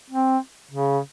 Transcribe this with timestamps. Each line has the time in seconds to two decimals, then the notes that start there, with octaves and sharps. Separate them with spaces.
0.10 C4
0.71 C#3